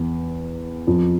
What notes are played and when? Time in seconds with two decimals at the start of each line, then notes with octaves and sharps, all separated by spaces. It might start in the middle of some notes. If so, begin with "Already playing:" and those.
Already playing: E2
0.87 F2